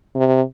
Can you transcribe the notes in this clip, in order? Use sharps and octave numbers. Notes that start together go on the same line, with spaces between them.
C3